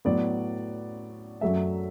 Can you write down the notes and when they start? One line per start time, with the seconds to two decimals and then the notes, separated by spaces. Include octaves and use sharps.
0.05 A2 F#3 B3 D5
1.41 F#2 F#3 A3 E5